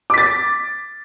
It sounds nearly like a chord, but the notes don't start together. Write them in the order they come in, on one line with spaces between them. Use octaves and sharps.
D6 B6 A6